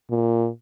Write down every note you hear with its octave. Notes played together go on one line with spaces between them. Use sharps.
A#2